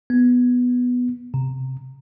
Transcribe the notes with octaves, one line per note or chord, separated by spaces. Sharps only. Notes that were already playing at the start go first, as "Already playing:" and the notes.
B3
C3